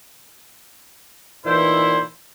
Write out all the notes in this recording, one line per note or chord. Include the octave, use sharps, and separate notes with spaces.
A#2 E3 D#4 E4 C5